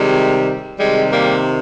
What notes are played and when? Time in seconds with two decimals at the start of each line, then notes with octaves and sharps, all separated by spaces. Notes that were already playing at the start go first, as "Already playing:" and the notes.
Already playing: C3 D#3 G3 G#3
0.78 C3 D#3 G3 G#3
1.12 G3 A#3